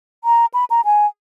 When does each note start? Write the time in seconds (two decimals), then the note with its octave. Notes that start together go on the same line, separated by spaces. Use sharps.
0.24 A#5
0.54 B5
0.70 A#5
0.85 G#5